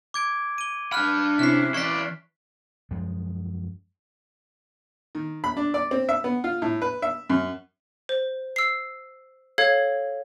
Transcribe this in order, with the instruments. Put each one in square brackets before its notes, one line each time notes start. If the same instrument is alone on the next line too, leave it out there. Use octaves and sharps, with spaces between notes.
[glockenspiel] D6 G#6 D7
D#7 G7
[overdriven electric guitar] D4 B5 [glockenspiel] F6 F#6
[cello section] C3 C#4 E4 [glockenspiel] F#6 C7
[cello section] E3 [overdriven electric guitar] E4 D5 [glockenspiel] C#6 B6
[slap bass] F#2 F3 G#3
[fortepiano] D#3
B5
D4
D5
C4
E5
B3
F4
A2
B4
E5
F#2
[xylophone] C5
E6 C7
A4 C#5 F5 G#6